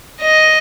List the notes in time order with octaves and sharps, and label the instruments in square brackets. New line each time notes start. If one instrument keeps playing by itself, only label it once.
[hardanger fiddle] D#5